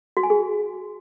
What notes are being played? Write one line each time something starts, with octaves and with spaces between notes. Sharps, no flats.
F#4
G#5
G#4